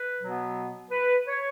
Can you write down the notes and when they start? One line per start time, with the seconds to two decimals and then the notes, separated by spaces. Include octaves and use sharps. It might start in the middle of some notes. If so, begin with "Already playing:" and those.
Already playing: B4
0.21 B2 F#3 B3
0.91 B4
1.27 C#5